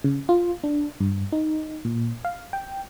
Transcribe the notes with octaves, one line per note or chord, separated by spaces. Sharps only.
C#3
F4
D4
G2
D#4
A#2
F5
G5